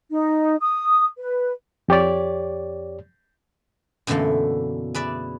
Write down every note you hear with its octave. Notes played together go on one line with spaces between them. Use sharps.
D#4
D#6
B4
F2 G4 C#5 D5
F#2 B2 D3 E3 A3 A#3
G#4 B4 D5 E5